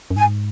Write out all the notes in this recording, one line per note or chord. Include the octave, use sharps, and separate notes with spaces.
F#2
G#2 G#5